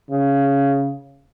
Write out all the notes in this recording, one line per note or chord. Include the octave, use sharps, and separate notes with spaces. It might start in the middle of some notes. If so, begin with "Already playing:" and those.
C#3